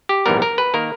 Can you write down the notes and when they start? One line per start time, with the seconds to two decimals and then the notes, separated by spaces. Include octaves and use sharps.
0.09 G4
0.26 A#1 G#2 E3 G3 B3 A#4
0.42 A#4
0.58 B4
0.74 D#3 A#3 A#4